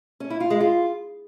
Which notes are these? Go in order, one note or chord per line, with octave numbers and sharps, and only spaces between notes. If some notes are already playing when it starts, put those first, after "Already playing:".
C#4
E4
F4
G#3
F4